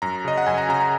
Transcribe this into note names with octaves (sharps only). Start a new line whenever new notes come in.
F#2 A#5
C#3 D#5
F#5
F#2 G#5
A#5
C#3 A#5
A#5